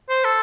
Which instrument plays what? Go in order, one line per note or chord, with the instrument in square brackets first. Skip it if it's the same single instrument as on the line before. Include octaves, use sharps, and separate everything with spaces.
[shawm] C5
A4